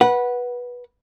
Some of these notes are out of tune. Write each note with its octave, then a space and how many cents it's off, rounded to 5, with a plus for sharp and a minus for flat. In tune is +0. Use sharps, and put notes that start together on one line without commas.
B4 -15 F#5 +0